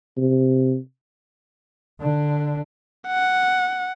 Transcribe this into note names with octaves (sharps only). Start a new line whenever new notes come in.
C3
D3 D4
F#5